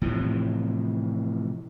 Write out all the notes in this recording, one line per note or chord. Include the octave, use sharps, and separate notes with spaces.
A2 C3 E3 F3